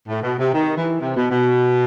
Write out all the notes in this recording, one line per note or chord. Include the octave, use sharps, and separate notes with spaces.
A2
B2
C3
D#3
E3
C3
B2
B2